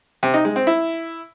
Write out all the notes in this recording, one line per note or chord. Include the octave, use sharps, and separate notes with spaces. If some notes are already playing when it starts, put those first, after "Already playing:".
C3
D#4
G#3
C4
E4